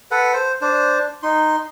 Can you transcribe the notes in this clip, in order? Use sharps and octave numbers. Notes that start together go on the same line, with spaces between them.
A4 B4 F#5
C5
D4 C5
D#4 C6